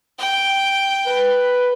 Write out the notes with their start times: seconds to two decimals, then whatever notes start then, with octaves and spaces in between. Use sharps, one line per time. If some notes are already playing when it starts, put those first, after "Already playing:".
0.19 G5
1.07 B4